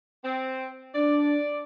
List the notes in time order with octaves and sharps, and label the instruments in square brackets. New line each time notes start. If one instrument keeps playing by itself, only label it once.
[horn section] C4
[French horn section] D4 [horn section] D5